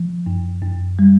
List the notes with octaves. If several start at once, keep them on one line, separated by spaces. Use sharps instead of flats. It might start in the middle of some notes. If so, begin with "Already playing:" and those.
Already playing: F3
F#2
F#2
G3